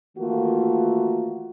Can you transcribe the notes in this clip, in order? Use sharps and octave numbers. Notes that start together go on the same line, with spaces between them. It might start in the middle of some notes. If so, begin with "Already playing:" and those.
D#3 E3 A3 A#3 F4 F#4